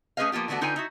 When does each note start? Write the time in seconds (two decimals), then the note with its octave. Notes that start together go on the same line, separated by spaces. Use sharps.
0.17 A3 C#4 G#4 B4 D#5 F5
0.32 F3 A#3 B3 F4 G4
0.48 D3 E3 A3 B3 D4 F#4
0.61 D3 D#4 F4 B4 G5 G#5
0.76 D#4 E4 F#4